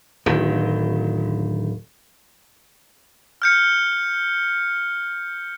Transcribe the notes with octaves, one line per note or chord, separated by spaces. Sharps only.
D1 D#3
F6 G6 C#7